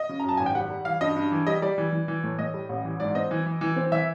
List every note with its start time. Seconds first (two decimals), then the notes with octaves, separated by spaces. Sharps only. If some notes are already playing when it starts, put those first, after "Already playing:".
Already playing: D#5
0.09 C#3
0.20 A#5
0.24 F#2 A5
0.37 G#1 G#5
0.46 G5
0.55 G3 F#5
0.70 G3
0.85 E3 F5
1.01 G2 D#5
1.16 G2
1.32 E3
1.47 G3 D#5
1.62 G3 D5
1.78 E3
1.92 E3
2.08 E3
2.23 A2
2.39 A2 D#5
2.54 G3
2.69 A1
2.85 E3
3.00 G#2 D5
3.15 C4 D#5
3.31 E3
3.46 E3
3.61 E3
3.76 C4
3.92 E3 E5